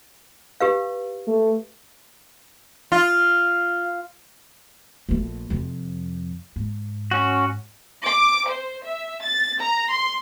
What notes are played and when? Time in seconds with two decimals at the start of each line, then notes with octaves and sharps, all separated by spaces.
0.61 G4 B4 F5
1.28 A3
2.92 F4
5.09 A#1 A3
5.50 F2 C3
6.56 G#2
7.11 C#4 F#4
8.04 D6
8.48 C5
8.83 E5
9.22 A6
9.59 A#5
9.91 C6